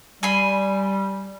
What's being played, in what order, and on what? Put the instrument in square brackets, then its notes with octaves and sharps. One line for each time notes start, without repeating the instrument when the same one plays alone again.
[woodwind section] G3 [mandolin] G#5 B5 C6